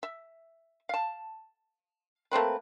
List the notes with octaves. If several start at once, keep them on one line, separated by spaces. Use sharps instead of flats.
E5
F5 A5
A3 A#3 C4 B4